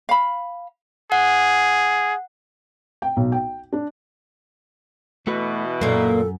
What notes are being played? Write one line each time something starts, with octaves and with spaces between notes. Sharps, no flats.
F5 B5
G#4 F#5
G5
B1
G5
D4
B2 E3 A3 F#4 B4
F#2 A#2 A#3 A4